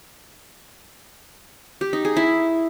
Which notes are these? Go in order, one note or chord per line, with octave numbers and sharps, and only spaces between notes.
G4
D#4
G#4
E4